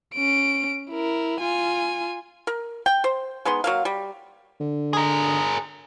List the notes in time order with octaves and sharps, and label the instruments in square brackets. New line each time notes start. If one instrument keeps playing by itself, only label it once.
[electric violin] C#4 D7
E4 A#4
F4 G#5
[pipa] A#4
G5
C5
G#3 B3 D#4 C6
F#3 A#3 F5
G3
[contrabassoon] D3
[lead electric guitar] G#4 A#4